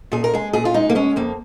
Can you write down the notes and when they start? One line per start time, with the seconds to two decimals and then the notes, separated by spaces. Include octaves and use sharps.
0.12 A#2 G#4
0.24 A#4
0.33 G#3 G#4
0.53 A#2 G#4
0.65 F4
0.74 G#3 D#4
0.90 A#3
0.95 G#3 C#4
1.16 F2 A#3